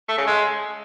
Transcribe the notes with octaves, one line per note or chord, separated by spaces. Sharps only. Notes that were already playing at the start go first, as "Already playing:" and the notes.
A3
C#3
G#3